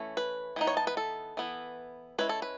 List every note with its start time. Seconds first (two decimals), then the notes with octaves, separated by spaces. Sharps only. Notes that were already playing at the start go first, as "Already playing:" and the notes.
Already playing: E3 A3 C#4 E4
0.17 B4
0.56 E3 B3 D#4
0.67 C#5
0.77 A5
0.87 B4
0.97 A4
1.37 E3 B3 E4
2.18 G#3 C#4 E4 B4
2.29 A4
2.42 B4